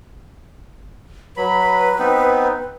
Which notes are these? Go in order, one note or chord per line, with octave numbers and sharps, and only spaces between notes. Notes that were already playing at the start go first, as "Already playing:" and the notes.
F#3 B4 B5
B3 C4 D#4